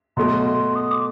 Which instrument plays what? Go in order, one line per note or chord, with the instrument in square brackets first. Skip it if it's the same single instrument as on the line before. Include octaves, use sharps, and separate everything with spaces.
[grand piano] B2 F#3 A3 [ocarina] C6
[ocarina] C6
D#6
D6